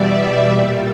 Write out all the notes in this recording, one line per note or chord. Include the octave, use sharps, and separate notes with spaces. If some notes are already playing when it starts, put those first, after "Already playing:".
Already playing: E2 B2 G3 D5 E5
A#2 G3